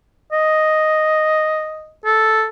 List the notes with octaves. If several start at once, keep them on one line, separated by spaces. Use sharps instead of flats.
D#5
A4